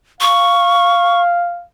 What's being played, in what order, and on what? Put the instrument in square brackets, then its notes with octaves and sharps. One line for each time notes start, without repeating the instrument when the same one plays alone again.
[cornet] F5 [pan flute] C#6